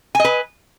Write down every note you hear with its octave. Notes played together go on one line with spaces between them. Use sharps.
B4 D#5 G#5